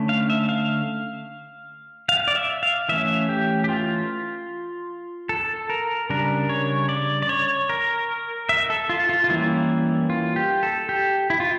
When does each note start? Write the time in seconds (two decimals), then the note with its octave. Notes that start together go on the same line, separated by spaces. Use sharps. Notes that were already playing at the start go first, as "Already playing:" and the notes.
Already playing: D3 A3 C#4
0.09 F5
0.30 E5
0.49 F5
2.09 F5
2.28 D5
2.35 E5
2.63 F5
2.89 E3 A3 C#4 E5
3.29 G4
3.64 G4
3.69 F4
5.29 A4
5.70 A#4
6.10 C#3 G3 D4 A#4
6.49 C#5
6.89 D5
7.22 D5
7.29 C#5
7.70 A#4
8.49 E5
8.70 A4
8.89 F4
9.09 F4
9.24 F4
9.29 E3 G3 A#3 C#4 E4
10.10 F4
10.36 G4
10.63 A4
10.89 G4
11.30 E4
11.40 F4